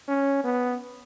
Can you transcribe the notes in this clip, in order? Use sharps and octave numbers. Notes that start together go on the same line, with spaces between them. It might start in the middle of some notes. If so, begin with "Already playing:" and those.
C#4
B3